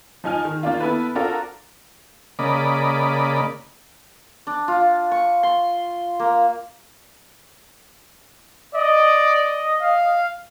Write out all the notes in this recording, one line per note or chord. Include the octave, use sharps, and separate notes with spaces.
F3 D#4 G#5 F6
D#3
D#3 A#3 D4 F4
B3 E4 A4 B4
C4 D4 F4 F#4 A4 A#4
C#3 A#3 D5 D#5 B5
D4
F4
C#6
C6
A#3
D5 D#5
F5